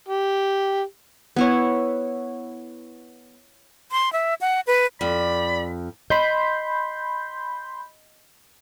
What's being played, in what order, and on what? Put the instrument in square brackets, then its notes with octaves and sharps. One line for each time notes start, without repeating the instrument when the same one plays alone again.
[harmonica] G4
[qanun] B3 E4 C#5
[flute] C6
E5
F#5
B4
[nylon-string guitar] F2 [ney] D5 [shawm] B5
[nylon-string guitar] D#5 [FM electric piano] B5 C6 G6